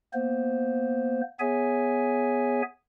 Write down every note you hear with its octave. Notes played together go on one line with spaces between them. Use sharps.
A#3 B3 C5
B3 G#4 C#5 E5 G#5